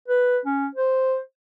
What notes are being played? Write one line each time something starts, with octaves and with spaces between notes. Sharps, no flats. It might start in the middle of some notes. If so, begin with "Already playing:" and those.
B4
C#4
C5